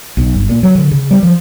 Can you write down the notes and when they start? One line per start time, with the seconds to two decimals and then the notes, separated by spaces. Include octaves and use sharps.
0.17 B1
0.34 G1
0.49 A#2
0.63 F#3
0.75 D3
0.91 C#3
1.11 G3
1.23 F3